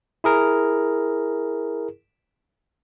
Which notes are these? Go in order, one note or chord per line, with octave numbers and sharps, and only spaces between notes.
E4 G#4 A#4